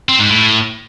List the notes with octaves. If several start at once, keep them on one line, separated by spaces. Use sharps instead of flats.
C4
G#2
A2